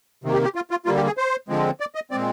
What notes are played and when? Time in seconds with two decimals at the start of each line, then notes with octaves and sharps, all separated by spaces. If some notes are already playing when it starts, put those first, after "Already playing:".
0.24 C3 D#3 A#3
0.33 G4
0.44 G4
0.55 F4
0.71 F4
0.85 D3 G3 A#3 F4
0.96 G4
1.06 G#4
1.17 C5
1.48 D3 F3 G#3 C4
1.80 D5
1.95 D#5
2.11 A#2 G#3 C4 D5